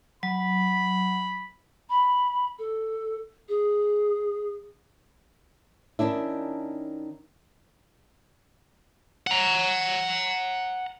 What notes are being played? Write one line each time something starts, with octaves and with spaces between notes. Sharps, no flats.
F#3 B5
B5
A4
G#4
D#3 C#4 D4 E4
F#5 A#5